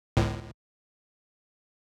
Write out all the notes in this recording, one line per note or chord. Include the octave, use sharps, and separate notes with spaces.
G1 C#2 A2